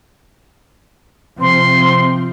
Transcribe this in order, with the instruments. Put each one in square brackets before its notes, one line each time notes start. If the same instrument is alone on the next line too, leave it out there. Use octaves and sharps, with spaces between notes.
[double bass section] C3 F3 C4 [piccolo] C6